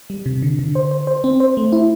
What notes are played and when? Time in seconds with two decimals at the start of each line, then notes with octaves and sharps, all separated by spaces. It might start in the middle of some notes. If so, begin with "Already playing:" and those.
0.10 G3
0.26 C3
0.42 D3
0.59 D3
0.75 C5
0.91 C5
1.07 C5
1.24 C4
1.40 C5
1.57 A3
1.72 E4